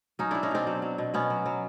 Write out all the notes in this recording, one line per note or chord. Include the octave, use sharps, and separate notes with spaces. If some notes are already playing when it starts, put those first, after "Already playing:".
F#3 C#4 D#4
F#3 D4 E4
C#4 D#4
B2 C4 D4
F#3
F#3
B2
B2 B3 C#4
F#3
F#3